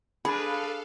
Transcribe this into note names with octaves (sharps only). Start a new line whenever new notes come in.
D4 G#4 A4 B4 F5 B5